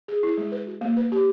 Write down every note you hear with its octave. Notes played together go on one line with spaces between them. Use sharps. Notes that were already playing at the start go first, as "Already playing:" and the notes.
G#4
E4
G#3
B4
F#4
A#3
B4
G4